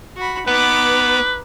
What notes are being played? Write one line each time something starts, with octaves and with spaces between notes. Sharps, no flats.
F#4 B5
B3 D#4 B4 D6